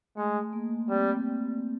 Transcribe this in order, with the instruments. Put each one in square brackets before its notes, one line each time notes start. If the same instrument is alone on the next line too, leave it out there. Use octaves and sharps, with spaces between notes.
[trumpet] G#3 [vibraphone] A3
[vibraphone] A#3
[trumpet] G3 [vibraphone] C4